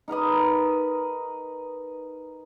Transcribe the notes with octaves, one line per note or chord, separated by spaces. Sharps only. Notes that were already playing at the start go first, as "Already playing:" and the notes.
D#4 A#4 B4 D#5